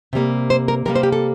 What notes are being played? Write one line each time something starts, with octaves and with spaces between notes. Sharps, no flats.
C3 G3 A#3
C5
A#4
C3 G3 A#3 A#4
C5
G4
A4